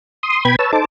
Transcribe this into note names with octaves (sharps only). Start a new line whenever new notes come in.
C6 D#6
B2 B4 G5 B5 G#6
B4 C#5 A5 E6
D#4 A4 C5 A5 D6